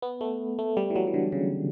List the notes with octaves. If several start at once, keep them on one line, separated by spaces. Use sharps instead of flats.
B3
A3
A3
G3
E3
F#3
E3
D3
C#3